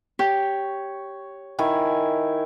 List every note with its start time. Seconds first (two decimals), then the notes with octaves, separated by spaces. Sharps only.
0.19 G4 C#5
1.59 D#3 E4 G#5